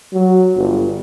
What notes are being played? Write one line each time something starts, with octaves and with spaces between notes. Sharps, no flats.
F#3
G1